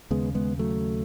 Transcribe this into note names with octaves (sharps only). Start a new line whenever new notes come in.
D#2 C#3 G#3 B3
G#3 B3
F#3 A3